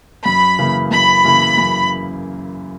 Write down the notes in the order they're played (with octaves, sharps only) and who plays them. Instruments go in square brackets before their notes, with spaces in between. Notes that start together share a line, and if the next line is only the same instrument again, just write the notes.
[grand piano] F#2 [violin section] B5
[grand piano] C#3 E3 A#3 E4
[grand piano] F#2 [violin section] B5
[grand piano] C#3 E3 A#3 E4
F#2